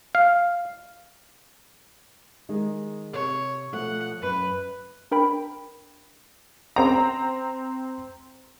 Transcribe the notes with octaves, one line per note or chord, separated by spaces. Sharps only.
F5
D#3 G#3 D#4
C3 C#5
B2 F3 A3 F#5
F#2 B4
D4 A#4 G5 B5
C4 A#5